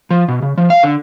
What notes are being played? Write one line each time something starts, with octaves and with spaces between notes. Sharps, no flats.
F3
B2
C#3
F3
F5
D3